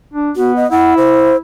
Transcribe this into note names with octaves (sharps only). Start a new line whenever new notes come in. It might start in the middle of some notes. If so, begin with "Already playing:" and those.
D4
B3 F#4
D#5
E4 F#5
C5